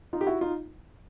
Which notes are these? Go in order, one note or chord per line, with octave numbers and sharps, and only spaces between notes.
D#4 F4
G4
E4 F#4
D#4 F4